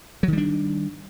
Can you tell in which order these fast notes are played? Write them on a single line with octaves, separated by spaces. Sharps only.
F#3 D#3 G3 D4